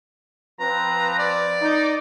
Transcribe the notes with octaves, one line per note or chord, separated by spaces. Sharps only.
F3 C4 B4 A#5
D5
D#4